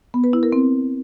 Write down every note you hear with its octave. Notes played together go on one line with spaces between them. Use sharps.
B3
B4
E4
A#4
C4